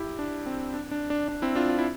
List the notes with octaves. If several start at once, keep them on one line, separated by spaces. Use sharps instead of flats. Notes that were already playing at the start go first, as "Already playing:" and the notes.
Already playing: E4 G4
D4
C4
D4
D4
D4
D4
C4 E4
D4 F4
F4
E4